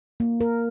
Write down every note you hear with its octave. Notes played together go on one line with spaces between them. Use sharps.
A#3
A#4